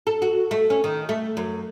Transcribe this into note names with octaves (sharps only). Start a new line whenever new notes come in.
A4
F#4
A3
C#4
D#3
A3
F#2